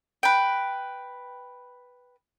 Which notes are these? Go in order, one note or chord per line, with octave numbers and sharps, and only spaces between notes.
B4 G5